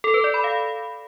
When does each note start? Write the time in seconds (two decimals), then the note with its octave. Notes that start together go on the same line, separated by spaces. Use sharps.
0.04 A4
0.14 B4
0.24 D5
0.34 B5
0.44 F5